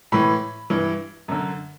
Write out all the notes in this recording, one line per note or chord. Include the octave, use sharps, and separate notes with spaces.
A2 E3 B5
G2 E3
F#2 D3